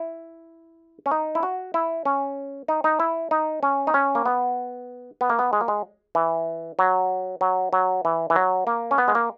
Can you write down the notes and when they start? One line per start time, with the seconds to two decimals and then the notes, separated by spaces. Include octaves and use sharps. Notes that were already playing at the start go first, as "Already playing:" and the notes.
Already playing: E4
1.06 C#4
1.11 D#4
1.35 E4
1.43 F#4
1.74 E4
2.05 C#4
2.68 D#4
2.84 D#4
3.00 E4
3.31 D#4
3.63 C#4
3.87 D#4
3.94 C#4
4.15 A#3
4.26 B3
5.21 B3
5.30 A#3
5.39 B3
5.53 G#3
5.61 A#3
5.68 G#3
6.15 E3
6.79 F#3
7.41 F#3
7.73 F#3
8.05 E3
8.30 E3
8.36 F#3
8.67 A#3
8.91 C#4
8.98 B3
9.08 G#3
9.15 A#3